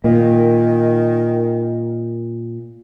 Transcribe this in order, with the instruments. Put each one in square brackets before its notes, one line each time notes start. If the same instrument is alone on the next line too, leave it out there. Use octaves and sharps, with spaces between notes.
[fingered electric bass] A#2 [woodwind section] D#3